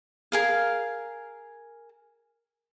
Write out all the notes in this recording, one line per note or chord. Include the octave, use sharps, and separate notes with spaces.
G#4 A#4 F5